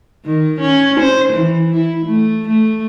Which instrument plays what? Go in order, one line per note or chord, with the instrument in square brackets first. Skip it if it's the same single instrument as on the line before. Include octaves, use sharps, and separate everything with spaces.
[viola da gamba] D#3
C#4
C5
E3
E4
A3
A3